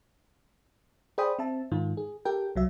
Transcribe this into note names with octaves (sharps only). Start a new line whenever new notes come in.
G#4 C5 D5 G5 B5 D#6
C4 E5 A5
G#2 D#3 F4
G#4
G4 A4 A#4 G5
C2 F#3 E5